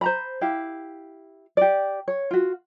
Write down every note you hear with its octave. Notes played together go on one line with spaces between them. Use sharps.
C5 A#5 B5
E4 G4 F5
G4 D5
C#5
F4 F#4